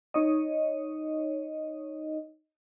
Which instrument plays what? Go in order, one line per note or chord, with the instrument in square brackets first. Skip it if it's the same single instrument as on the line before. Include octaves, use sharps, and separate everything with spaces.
[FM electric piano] D#4 C#5 D#5